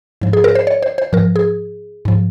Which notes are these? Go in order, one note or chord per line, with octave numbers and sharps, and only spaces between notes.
G#2 F3
G#4
A#4
C5
C#5
C5
C5
G#2 F3 A#4
G#4
G#2 F3